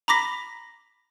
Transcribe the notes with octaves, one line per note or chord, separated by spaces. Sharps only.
A#5 B5 D6 A#6 B6